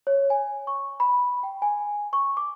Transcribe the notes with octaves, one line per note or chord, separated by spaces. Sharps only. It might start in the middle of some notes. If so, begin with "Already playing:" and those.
C#5
G#5
C#6
B5
G5
G#5
C#6
D6